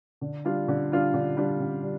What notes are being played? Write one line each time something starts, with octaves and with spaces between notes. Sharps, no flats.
D3
G3 D4 F4
D3
G3 D4 F4
D3
G3 D4 F4
D3
G3